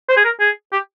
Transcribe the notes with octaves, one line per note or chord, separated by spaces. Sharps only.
C5
G#4
A#4
G#4
G4